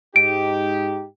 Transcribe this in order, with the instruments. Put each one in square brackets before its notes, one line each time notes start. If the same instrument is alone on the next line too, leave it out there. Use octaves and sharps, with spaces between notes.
[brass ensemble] G#2 D#4 G4 [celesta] D7